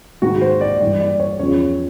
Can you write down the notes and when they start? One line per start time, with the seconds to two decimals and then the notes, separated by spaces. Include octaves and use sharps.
0.22 G#2 D#3 F#4
0.41 C5
0.61 D5
0.81 G2 E3 D5
1.00 D5
1.20 C#5
1.39 E2 C#3 F3 C#5